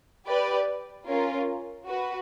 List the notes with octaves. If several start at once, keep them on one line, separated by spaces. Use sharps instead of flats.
G4 B4 D5
C#4 F4 A#4
F#4 B4